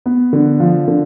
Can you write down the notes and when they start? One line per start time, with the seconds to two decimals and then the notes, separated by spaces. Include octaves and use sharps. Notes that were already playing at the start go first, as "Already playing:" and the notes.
0.06 B3
0.33 D3
0.60 F3
0.88 D3